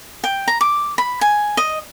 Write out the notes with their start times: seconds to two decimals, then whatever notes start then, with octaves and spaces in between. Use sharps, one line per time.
0.24 G5
0.48 A#5
0.61 D6
0.98 B5
1.21 G#5
1.57 D#5